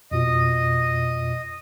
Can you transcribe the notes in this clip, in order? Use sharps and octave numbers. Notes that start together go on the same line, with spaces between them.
F2 B2 F4 D#5